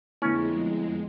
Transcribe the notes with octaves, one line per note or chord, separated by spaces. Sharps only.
F2 D3 G#3 A3 B3 C#4 E4